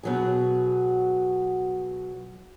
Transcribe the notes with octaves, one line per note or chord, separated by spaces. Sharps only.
B2 F#3 G#4